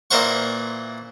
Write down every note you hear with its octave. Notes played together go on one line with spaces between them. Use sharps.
A#2 E3 A#4 C5 F#5 C#6